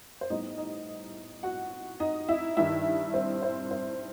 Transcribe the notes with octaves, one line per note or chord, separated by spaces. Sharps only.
C5
A2 G3 B3 D#4 D#5
D#4 D#5
F#4 F#5
D#4 D#5
E4 E5
G2 D#3 G3 D#4 E4 E5
C4 C5
C4 C5
C4 C5